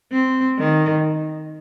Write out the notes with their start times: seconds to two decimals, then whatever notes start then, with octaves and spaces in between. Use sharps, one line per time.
0.12 C4
0.58 D#3